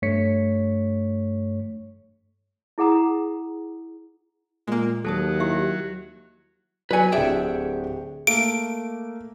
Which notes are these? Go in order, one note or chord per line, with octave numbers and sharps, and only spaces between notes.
G2 A3 C#5 B6 C#7
E4 G#4 F#5 A#5 D#6
A#2 G#3 A#3
D#2 F#3 A4 A5 D#6
E4 G4 E5
F#3 B4 D5 G#5 C#7
D1 D4 G4 G#4 D5 E5
A3 A#3 D7